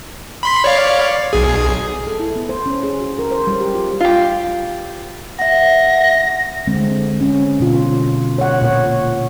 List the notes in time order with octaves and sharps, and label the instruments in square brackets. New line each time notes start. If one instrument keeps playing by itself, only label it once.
[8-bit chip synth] B5 C6 B6
C#5 D5 F5
B1 G#4
[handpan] A4
E4
B3
C5
C#4
G#4
F#4
A#4
C5
G3
G4
F4
[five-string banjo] F4 G4
[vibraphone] E5 F#5 [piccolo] A#6
[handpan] D3 G#3 C4
C#4
B2 D3 F4
C#5 F#5
A#2 C#5